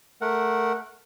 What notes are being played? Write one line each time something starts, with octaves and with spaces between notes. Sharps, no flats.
A3 A#4 F#5